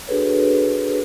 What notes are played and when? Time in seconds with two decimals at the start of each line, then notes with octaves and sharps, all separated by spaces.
0.07 D4 F#4 G#4 A4 B4 C#5